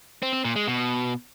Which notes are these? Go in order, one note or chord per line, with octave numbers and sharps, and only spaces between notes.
C4
C4
A#2
G#3
B2